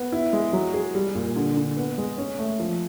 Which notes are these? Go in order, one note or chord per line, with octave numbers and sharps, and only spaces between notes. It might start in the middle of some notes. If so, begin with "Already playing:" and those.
Already playing: B3
E4
G#3
F#3
G#4
G3
A#2
D3
D3
B3
G#3
C#4
A3
F3